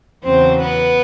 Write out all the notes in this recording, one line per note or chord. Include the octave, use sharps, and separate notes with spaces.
E2 C#3 F#3 C4 C5
B3 B4